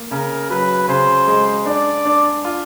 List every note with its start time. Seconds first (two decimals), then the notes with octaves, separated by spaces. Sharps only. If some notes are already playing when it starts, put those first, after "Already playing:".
Already playing: A#3
0.11 C#3 A#4
0.50 F#3 B4
0.89 C#3 C5
1.28 G#3
1.66 D4 D5
2.05 D4
2.45 F4